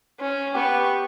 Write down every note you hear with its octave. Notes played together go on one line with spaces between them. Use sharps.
C#4
B3 G4 C#6